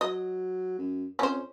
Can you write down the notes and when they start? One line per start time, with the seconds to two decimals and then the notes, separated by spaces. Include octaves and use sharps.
0.01 F#3 D#5
0.78 F#2
1.19 F2 C#4 C5